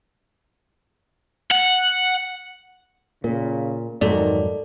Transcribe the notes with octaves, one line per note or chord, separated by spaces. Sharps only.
F#5
A#2 C#3 A#4
F2 G#2 D#3 F#3 A3 D5